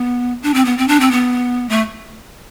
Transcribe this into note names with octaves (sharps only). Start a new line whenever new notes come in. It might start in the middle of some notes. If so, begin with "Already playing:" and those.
Already playing: B3
D4
C4
B3
C4
D4
C4
B3
A3